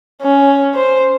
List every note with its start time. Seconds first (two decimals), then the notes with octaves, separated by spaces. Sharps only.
0.22 C#4
0.75 C5